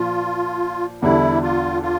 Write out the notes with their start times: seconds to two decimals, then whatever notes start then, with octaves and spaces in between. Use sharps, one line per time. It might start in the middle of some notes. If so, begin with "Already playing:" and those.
Already playing: A#2 F3 F4
1.02 E2 D3 G3 D4 E4 A4
1.43 F4
1.83 F4